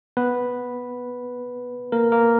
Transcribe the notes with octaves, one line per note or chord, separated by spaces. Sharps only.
B3 B4
A#3 A#4
A#3 A#4